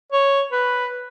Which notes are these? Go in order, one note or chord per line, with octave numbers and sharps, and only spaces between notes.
C#5
B4